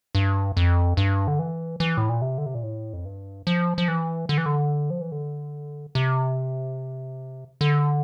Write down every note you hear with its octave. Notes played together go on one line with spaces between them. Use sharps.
G2
F2
G2
D3
E3
E3
A2
A#2
C3
D3
C3
A#2
A2
F2
G2
F3
F3
E3
D3
E3
D3
F3
E3
D3
C3
D3